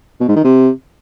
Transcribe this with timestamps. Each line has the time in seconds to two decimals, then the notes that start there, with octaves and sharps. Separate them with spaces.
0.20 B2
0.28 G#2
0.36 D#3
0.44 C3